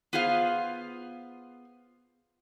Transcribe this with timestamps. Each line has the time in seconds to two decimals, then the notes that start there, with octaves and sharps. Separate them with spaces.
0.13 B3 F4 G#4 C5 F5